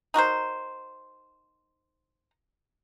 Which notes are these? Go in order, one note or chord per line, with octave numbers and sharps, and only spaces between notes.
D#4 F#4 A#4 C5